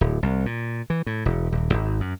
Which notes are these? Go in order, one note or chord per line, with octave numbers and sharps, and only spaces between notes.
D1
C2
A#2
E3
A2
E1
D#1
G#1
F#2